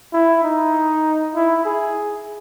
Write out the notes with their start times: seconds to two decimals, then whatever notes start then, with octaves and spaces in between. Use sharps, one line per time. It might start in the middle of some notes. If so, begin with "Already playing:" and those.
0.13 E4
0.44 D#4
1.35 E4
1.65 G#4